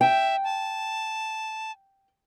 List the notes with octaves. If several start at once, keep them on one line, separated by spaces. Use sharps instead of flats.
E5 G5
A5